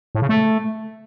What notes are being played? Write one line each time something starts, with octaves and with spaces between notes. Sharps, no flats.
A2
C#3
A3